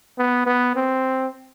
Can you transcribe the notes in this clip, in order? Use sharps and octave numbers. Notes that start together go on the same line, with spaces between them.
B3
B3
C4